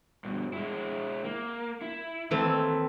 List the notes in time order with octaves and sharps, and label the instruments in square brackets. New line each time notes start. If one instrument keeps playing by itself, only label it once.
[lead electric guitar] G2 B2
G#3 E4
A#3
E4
[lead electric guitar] D#2 [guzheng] E3 A3 C4